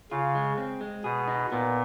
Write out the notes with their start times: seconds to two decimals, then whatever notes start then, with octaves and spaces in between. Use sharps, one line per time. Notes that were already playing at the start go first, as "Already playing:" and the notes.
0.11 C#3 F4
0.35 G#3
0.58 C4
0.81 G#3
1.04 B2 G#4
1.28 D#4
1.51 A#2 B3